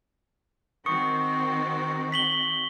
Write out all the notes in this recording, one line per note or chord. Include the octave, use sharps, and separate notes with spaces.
D#3 C4 F#4 C#6 D#6 C#7
B6 F#7 G7